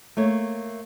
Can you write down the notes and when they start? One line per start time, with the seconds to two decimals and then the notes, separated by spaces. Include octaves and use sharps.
0.17 A3 A#3 C#5